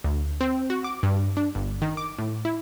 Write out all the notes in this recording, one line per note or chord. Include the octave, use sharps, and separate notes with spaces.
D2
C4
F#4
D6
G2
D4
G1
D#3
D6
A2
E4